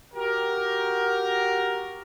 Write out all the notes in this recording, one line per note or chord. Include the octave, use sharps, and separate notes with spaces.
F#4 G4 A#4